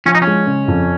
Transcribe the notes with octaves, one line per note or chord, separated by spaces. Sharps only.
F3 C#4
D#4
C#4
G#3
C#3
F2